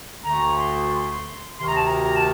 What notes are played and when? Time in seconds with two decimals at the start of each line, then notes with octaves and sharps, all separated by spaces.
0.23 D2 D3 A3 A#5
0.58 C6
1.58 D2 C3 D#3 C6
1.67 A#5
1.75 A5
1.84 A#5
2.02 A#5
2.14 A5